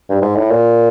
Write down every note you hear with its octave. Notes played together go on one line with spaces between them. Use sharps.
G2
G#2
A2
A#2